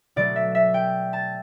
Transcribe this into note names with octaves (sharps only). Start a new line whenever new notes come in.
B2 F#3 A3 D5
E5
E5
G5
A5